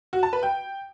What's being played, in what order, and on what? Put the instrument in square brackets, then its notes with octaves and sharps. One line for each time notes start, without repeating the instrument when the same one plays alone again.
[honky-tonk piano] F#4
A5
B4
G5